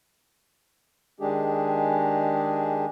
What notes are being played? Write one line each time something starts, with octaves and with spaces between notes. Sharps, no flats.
D#3 G#3 D4 G4 G#4